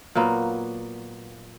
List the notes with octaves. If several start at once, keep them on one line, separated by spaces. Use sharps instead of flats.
A#2 F#3 A#3 B3